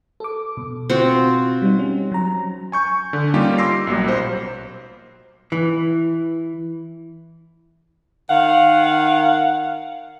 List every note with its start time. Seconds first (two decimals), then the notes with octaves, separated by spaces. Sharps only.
0.20 A4 D6
0.57 B2
0.90 C4 F4 F#4
1.62 G3 D#4
1.79 C#4
2.12 F#3 A#5
2.72 G#5 C#6 G6
3.13 D3
3.34 G3 A#3 C#4 D#4 F4 G4
3.58 C6 D6 E6 A#6 C7
3.87 B1 A#2 F#3 G3
4.07 B1 C5
5.52 E3
8.29 D#3 F5 F#5